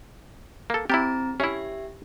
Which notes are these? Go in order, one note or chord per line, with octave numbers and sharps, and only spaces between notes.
A#3 A4
C4 E4 G4 A#5
C#4 E4 G4 E5